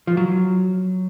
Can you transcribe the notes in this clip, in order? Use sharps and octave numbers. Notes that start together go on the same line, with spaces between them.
F3
F#3